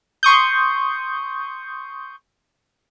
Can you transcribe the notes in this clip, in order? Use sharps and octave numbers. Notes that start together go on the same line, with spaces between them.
C6 C#6 D#6 G6